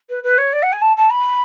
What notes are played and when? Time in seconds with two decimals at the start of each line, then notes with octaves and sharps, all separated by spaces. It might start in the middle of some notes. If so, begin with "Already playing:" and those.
0.09 B4
0.23 B4
0.37 C#5
0.52 D5
0.62 F#5
0.72 G#5
0.81 A5
0.96 A5
1.10 B5